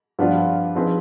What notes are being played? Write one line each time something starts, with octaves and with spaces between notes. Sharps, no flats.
G2 F3 B3 D4 F4
F3 C4 D#4 G#4 B4